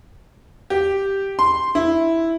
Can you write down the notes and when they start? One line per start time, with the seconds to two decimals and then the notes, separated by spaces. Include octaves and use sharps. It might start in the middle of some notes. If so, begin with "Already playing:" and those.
0.70 G4
1.39 C6
1.75 E4